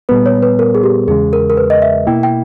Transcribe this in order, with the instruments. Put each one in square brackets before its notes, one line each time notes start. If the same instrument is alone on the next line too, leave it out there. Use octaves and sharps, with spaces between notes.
[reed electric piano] A#2 G3 B3 [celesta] B4
[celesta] C#5
B4
A#4
G#4
G4
[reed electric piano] E2 C#3 G#3 [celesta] G#4
[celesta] A#4
A#4
B4
D#5
E5
[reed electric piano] B2 A#3 E4 [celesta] G5
[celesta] G5